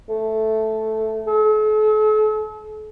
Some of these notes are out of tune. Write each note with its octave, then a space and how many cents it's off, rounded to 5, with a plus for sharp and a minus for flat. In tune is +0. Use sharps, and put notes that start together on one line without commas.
A3 -5
A4 -45